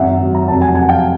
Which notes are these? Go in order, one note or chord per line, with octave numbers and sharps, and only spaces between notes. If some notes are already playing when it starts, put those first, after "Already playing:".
Already playing: G#1 F#2 E5 F#5
F#3
A#5
F1 A5
F#5 G#5
F1 F#5 G#5
F5 G5